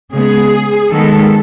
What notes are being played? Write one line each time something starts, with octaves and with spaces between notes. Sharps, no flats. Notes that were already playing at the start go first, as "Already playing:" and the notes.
C#3 G#3 B3 G#4
D#3 G#3 B3 A4